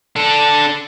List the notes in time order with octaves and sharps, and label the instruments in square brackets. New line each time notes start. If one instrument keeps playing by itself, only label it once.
[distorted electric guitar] D4 A4